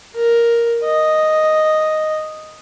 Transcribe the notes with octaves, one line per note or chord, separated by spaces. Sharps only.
A#4
D#5